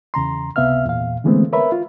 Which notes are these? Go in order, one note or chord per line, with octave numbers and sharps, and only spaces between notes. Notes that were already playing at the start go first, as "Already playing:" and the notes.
E2 C#3 A#5 C6
C#2 C3 B3 E5 F5 F6
E2 A#2 F5
D3 E3 G#3 A3 B3 C4
A#4 B4 C#5 E5 B5
F4